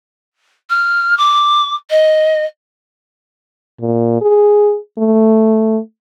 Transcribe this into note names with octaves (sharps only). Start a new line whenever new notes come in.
F6
D6
D#5
A#2
G#4
A3